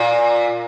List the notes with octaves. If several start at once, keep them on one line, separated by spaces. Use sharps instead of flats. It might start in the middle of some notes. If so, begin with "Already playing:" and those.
Already playing: A#2